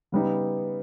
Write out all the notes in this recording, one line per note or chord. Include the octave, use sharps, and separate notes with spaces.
C#3 G3 B3 D#4